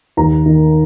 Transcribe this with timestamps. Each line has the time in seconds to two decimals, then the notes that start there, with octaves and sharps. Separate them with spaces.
0.17 D#2 A#5
0.46 D#3